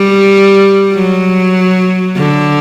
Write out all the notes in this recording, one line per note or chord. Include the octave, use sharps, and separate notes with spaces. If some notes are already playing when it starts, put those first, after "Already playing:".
Already playing: G3
F#3
D3